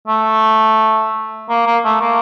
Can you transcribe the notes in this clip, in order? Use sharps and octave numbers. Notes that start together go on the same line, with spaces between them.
A3
A#3
A#3
A3
A#3